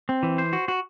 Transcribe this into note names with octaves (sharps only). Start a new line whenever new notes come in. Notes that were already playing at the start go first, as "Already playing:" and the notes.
C4
E3
C5
F#4
F#4